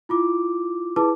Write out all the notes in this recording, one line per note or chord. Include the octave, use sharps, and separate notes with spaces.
E4 F4 D6
E4 G#4 B4 A5 D6